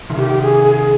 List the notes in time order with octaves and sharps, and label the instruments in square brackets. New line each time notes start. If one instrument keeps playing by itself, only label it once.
[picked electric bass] C3 D#3
[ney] G4
G#4
G#4